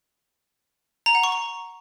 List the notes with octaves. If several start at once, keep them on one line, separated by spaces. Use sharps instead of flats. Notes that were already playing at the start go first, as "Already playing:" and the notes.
A#5
F#5
C#6
A#5